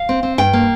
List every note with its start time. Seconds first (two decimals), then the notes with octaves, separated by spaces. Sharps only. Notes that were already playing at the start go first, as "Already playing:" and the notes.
Already playing: F5
0.09 C4
0.23 C4
0.38 G2 G5
0.53 A#3